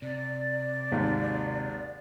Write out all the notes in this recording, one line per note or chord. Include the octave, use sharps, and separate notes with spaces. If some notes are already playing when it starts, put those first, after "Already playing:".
C3 D5
G#1 D#2